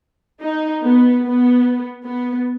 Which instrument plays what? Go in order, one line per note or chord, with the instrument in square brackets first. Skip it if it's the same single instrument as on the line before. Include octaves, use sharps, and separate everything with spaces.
[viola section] D#4
B3
B3
B3